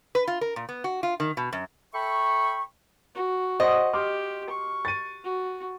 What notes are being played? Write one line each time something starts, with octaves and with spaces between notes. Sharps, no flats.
B4
F4
A#4
A#2
B3
F#4
F4
D#3
B2
F#2
A4 E5 G5 B5 C#6
F#4
C5 D#5 F#5
G4 C6 D6 F6
C#6
A6 D#7
F#4